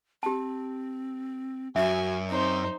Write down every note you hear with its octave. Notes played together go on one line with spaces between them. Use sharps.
C4 G4 A5
F#2 F#4 E5 G#5
C4 D#4 C5